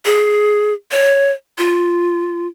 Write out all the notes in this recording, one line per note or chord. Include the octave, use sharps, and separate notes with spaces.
G#4
C#5
F4